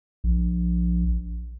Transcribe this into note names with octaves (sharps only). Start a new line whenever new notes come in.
A#1